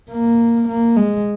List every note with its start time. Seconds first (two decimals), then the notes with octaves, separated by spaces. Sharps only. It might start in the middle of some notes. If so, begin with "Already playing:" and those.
0.11 A#3
0.69 A#3
0.97 G#3